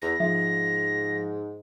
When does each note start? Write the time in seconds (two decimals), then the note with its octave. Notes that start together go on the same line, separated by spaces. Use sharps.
0.02 E2 A#6
0.20 G#2 F3 E5